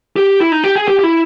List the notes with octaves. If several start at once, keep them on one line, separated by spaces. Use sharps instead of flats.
G4
E4
D#4
G4
G#4
G4
G4
E4